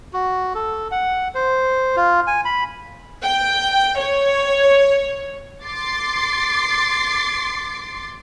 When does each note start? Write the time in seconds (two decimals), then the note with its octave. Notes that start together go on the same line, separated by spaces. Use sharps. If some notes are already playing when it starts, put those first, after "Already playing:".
0.13 F#4
0.55 A4
0.91 F#5
1.35 C5
1.96 F4
2.27 G#5
2.45 B5
3.23 G5
3.99 C#5
5.66 C6 D6 A6 C7